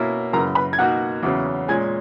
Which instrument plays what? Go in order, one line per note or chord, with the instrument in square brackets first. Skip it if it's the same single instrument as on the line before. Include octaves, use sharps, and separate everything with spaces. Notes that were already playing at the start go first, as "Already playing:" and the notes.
Already playing: [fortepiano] B2 A#3 C#4 E4
[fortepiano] F#2 C#3 E3 [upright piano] A#4 A#5
[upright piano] B4 B5
G#6
[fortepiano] B2 A#3 D#4 F#4 [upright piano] F#5 F#6
[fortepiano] E2 C#3 F#3 C#4
[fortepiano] A#2 G#3 C#4 [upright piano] G#5 G#6